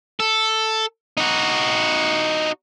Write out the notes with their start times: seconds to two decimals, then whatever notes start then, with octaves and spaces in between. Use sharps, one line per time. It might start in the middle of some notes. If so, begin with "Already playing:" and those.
0.20 A4
1.17 D#4 F#4